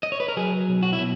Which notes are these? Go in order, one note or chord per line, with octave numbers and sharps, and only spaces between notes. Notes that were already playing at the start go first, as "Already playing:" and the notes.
D#5
C#5
B4
A#4
F#3 G#4
B1
F#4
E4
B2